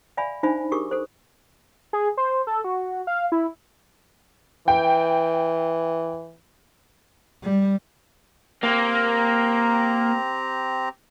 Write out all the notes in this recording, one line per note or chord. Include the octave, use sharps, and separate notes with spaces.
D5 E5 F5 G#5 B5
D4 D#4 C5 E5 G#5 B5
G4 G#4 A#4 C#6 D#6
A4 C5
G#4
C5
A4
F#4
F5
E4
E3 G5
G3
A#3 C4 G4 A#5